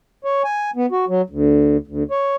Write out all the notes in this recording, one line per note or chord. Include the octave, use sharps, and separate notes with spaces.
C#5
G#5
B3
F#4
F#3
D2
D2
C#5